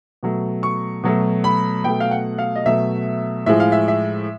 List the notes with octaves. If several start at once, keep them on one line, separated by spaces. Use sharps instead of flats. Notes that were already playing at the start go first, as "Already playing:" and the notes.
B2 F#3 A3
C#6
B2 F#3 A3
B5
B2 F#3 A3 G5
F5
F#5
F5
D#5
B2 F#3 A3 E5
A2 F3 G#3 E5
F5
E5
E5